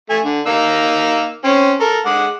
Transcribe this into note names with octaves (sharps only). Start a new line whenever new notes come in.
A3 G#5
D3
A#3 D#4 E6
C4 C#4
A4 A#4
G#3 F#5 D6